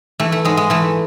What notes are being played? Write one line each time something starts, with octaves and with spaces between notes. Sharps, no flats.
E3 A3
A3
G#2 G#3
G#3
E3 A3